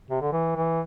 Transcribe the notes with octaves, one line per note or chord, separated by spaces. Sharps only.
C3
D3
E3
E3